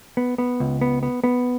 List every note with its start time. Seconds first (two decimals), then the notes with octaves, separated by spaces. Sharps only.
0.17 B3
0.38 B3
0.60 C#2
0.81 B3
1.03 B3
1.24 B3